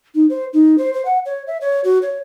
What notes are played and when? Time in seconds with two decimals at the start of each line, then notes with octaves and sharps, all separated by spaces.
0.15 D#4
0.29 C5
0.53 D#4
0.78 C5
0.94 C5
1.05 F#5
1.25 C#5
1.47 E5
1.61 C#5
1.84 F#4
2.02 C#5